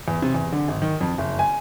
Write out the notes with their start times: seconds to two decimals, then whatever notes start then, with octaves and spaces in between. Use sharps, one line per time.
0.08 E2
0.22 C3
0.34 E2
0.52 D3
0.68 G#1
0.82 D#3
1.01 F2
1.18 F#1
1.39 G#5